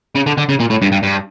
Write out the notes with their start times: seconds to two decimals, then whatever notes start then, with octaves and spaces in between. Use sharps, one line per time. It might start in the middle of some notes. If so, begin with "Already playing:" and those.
0.15 C#3
0.26 D3
0.38 D3
0.49 C#3
0.60 A#2
0.70 A2
0.82 G2
0.92 G2
1.03 G2